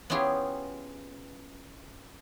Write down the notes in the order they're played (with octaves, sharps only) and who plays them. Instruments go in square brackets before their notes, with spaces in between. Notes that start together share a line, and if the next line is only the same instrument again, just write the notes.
[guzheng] B3 C#4 E4 F4 G4 G#4